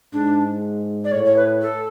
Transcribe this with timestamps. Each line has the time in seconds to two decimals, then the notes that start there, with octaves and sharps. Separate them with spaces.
0.13 G#2 D4
1.04 D5
1.12 A2 C#5
1.25 C#5
1.36 B4
1.62 A4